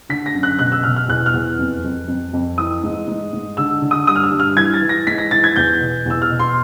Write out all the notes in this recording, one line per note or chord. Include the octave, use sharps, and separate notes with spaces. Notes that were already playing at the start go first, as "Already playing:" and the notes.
D3 B6
A#6
F#2
F#6
B2 F#6
E6
B2 F6
F6
E2 F#6
F6
E2
F2
F2
F2
F2
E3 D#6
G#2
G#2
G#2
D3 E6
D3
D#6
G2 D#6
F6
E6
G2
F6
E3 G#6
A6
E3
A#6
G#2 B6
A#6
E3 A6
G#6
E2 G6
B2
E2 E6
F6
B2
C6